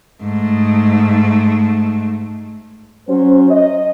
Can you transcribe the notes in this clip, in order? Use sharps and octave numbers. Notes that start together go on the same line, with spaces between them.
G#2 A3
F#3 C#4 C5
D#5